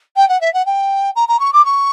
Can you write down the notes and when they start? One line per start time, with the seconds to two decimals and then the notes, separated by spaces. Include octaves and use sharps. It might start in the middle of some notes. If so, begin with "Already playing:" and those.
0.17 G5
0.29 F#5
0.41 E5
0.54 F#5
0.66 G5
1.16 A#5
1.28 A#5
1.40 C#6
1.53 D6
1.65 C#6